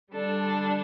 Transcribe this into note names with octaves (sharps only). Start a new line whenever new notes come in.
D3 G3 D4 A4
A4